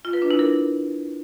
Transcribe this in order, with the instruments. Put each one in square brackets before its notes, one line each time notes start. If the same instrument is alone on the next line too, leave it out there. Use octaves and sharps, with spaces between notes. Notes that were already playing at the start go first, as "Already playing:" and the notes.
[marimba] F4
B4
D4
E4
A#4